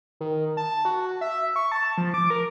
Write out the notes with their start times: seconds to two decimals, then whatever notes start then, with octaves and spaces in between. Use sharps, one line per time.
0.20 D#3
0.57 A5
0.85 F#4
1.21 E5
1.56 C#6
1.72 A5
1.98 F3
2.14 D6
2.30 A#4